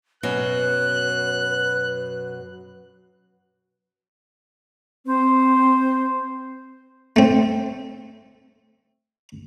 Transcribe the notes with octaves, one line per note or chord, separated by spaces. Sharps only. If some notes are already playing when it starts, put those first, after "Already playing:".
F#2 B2 F#3 B4 F#6
C4 C5
A3 C4